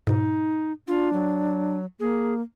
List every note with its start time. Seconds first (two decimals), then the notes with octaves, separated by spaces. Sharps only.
0.07 G#2 B2 D#4
0.88 D4 F4
1.13 F#3
2.00 A#3 G#4